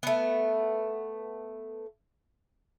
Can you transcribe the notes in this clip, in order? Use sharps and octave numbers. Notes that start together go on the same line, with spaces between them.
A3 B3